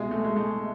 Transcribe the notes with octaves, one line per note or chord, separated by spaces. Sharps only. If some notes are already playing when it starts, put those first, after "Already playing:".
Already playing: C2 B2 G#3
A3
G#3
A3